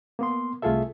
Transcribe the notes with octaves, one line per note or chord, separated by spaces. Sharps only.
A#3 B3 C6
C2 A3 F4 G#4 A4 E5